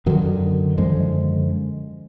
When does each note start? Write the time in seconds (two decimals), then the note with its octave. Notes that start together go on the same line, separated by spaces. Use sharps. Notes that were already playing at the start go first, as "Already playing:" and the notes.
0.06 F#2 D3 D#3 F#3
0.78 F#2 D3 F3 G#3